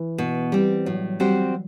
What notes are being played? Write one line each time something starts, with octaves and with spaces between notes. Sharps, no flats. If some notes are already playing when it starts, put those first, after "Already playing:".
Already playing: E3
B2
G3 C4
A2 F#3
G3
F#3
G3 C4 F#4 C5